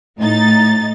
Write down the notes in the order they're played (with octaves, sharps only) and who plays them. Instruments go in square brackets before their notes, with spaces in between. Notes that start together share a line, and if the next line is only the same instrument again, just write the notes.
[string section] A2 D#4 A6